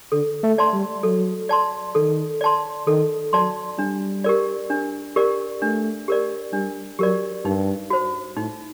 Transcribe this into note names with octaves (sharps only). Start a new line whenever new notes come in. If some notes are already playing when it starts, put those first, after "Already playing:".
D3 A4
A3
D5 A5 C6
G3
F#3 A4
D5 A5 C6
D#3 A4
D5 A5 C6
D#3 A4
F#3 D5 A5 C6
G3 D4
G4 A#4 D5
D4
G4 A#4 D5
A3 D4
G4 A#4 D5
G3 D4
F#3 G4 A#4 D5
G2 D#4
F#4 C5
A2 D#4